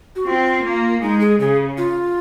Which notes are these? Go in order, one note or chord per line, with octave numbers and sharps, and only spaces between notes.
F#4
C4 F4
A#3
G#3 D#4
G#4
C#3 G#4
F4